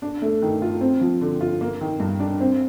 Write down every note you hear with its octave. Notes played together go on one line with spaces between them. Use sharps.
D4
A3
D#3
F4
C4
F3
D3
F4
A#3
D#3
G2
D4
C4